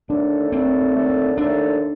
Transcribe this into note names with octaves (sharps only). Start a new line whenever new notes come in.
D#2 D3 A3 D4 D#4 A4
D#2 D3 A3 C4 D#4 A4
D#2 D3 A3 D#4 A4
D#2 D3 A3 D4 D#4 A4